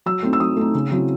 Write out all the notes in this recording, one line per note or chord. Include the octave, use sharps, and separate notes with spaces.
F#3 E6
A3 C4 D#4
E6
F#3 D#6
A3 C4 D#4
C#3
F#3 C4 E4